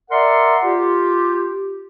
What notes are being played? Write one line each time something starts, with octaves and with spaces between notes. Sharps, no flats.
A#4 D5 E5 F#5 A#5 C6
F4 G4